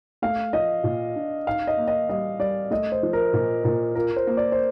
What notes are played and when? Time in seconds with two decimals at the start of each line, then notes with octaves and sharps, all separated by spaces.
0.22 A3 F5
0.53 F3 D#5
0.84 A#2
1.16 D4
1.46 D#4 F5
1.67 D#5
1.77 A#3
1.88 D#5
2.09 G3 D#5
2.39 G3 D5
2.71 A3 D#5
2.92 C5
3.03 F3
3.13 A#4
3.33 A#2
3.64 A#2 A#4
3.95 F4 A#4
4.16 C5
4.27 A#3
4.37 D5
4.52 C5